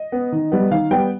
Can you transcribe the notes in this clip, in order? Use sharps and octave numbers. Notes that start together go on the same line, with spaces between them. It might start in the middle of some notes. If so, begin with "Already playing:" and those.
Already playing: D#5
B3
D#3
G3 B3
D#3 F5
G3 B3 G5